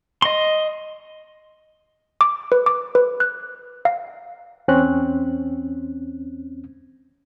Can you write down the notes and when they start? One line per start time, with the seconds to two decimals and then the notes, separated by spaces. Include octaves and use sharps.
0.22 D#5 C6
2.21 D6
2.52 B4
2.66 D6
2.95 B4
3.20 F#6
3.85 F5
4.68 E2 C4 C#4 F#6